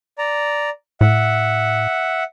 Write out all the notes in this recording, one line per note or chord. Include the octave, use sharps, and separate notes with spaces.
D5 A#5
A2 E5 F#5